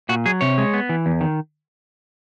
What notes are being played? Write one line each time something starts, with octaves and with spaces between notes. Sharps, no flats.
A#2 F#4
F#3 G#4
C3 C#5
G#3
B3
E3
E2
D#3